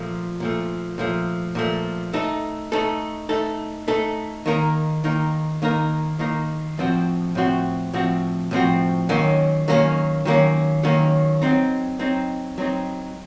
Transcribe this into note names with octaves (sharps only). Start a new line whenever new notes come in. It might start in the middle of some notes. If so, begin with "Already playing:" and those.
Already playing: A#2 F3 A3
A#2 F3 A3
A#2 F3 A3
A#2 F3 A3
A3 D#4 A4
A3 D#4 A4
A3 D#4 A4
A3 D#4 A4
D#3 A#3 D#4 A#4
D#3 A#3 D#4 A#4
D#3 A#3 D#4 A#4
D#3 A#3 D#4 A#4
A2 F3 C4 F#4
A2 F3 C4 F#4
A2 F3 C4 F#4
A2 F3 C4 F#4
D#3 F#3 A#3 C#4
D#3 F#3 A#3 C#4
D#3 F#3 A#3 C#4
D#3 F#3 A#3 C#4
F#3 C4 D#4
F#3 C4 D#4
F#3 C4 D#4